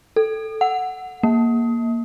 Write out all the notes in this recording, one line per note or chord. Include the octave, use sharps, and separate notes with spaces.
A4
F#5
A#3